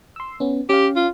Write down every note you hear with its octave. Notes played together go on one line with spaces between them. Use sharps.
C6 E6
B3 C#4
C#4 G4 F5
F4